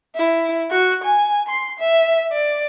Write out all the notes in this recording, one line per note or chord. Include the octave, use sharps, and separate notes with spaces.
E4
F#4
G#5
C6
E5
D5